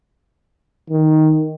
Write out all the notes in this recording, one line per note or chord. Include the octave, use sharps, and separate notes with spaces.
D#3